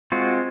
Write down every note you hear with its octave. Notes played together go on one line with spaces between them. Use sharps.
G#3 C4 F4 F#4